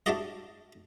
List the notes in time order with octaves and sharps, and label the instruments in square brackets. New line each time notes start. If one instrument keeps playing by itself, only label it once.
[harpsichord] D4 E4 F#4 G4 D5 D#5